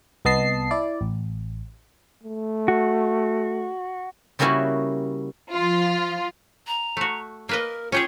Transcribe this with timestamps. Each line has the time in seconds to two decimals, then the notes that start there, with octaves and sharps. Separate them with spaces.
0.25 C2 B3 D#5 A5 C7
0.71 E4 D5
1.01 A1
2.23 A3
2.68 F#4
4.39 C#3 G3 A#3 C#4 E4 F#4
5.53 F3 F4
6.67 A#5
6.97 A3 F#4
7.49 A#3 A#4 B4 D#5
7.92 C#4 F4 G4 G#4